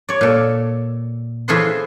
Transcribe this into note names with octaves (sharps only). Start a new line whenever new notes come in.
C#5 D5
A#2 A4
E3 F4 G#4 A4 C5 C6